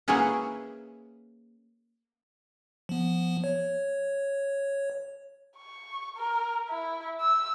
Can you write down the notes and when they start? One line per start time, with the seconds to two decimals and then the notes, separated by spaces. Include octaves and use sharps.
0.08 A#3 C#4 E4 G#4 B4 F#5
2.89 F3 B3
3.44 C#5
5.57 C#6
6.17 A#4
6.69 E4
7.21 E6